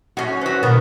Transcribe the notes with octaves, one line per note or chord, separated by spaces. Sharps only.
F#2 C#4 F#4
F#3 C#4 B4 C5 F#5
B2 D#3 B3 A#4 B5